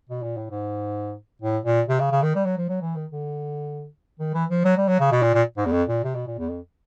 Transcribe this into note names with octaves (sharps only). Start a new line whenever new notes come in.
B2
A#2
A2
G#2
A2
A#2
C3
C#3
C#3
D#3
G3
F#3
F3
F#3
E3
D#3
D3
D#3
E3
F3
F#3
G3
F#3
C#3
B2
A#2
A#2
G#2
E2
F2
A#2
C3
B2
A#2
E2
F2